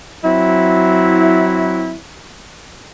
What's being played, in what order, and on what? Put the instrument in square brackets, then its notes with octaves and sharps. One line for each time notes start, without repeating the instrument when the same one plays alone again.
[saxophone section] F#3 C4 E4